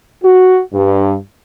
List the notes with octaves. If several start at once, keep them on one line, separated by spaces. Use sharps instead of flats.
F#4
G2